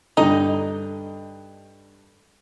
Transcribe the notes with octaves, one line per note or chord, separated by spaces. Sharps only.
G2 D3 D#4 D#5